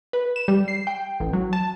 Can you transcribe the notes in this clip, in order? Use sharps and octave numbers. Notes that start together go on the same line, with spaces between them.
B4
E7
G3
C7
G5
A1
F#3
A5